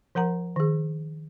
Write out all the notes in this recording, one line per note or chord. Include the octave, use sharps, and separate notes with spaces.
F3 A#4 F#5 A#5
D#3 G#4